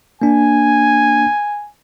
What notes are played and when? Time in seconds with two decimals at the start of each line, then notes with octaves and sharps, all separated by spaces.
0.22 A#3 D4 G#5